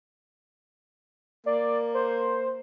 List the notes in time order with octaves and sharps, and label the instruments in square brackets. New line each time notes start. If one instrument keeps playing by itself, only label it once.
[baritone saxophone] A#3 [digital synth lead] D5
[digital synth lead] C5